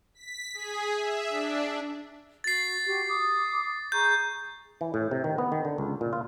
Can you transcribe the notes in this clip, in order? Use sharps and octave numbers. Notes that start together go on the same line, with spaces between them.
B6
G#4
E5
D4
F#4 A6 C7
F#4 G4
D6 D#6
G#4 A#5 C#6 G6
E3
A2
C3
D#3
B3
D#3
D3
C#2
A#2
F4